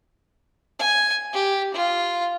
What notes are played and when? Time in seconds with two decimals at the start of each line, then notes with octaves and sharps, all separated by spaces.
0.79 G#5
1.33 G4
1.74 F4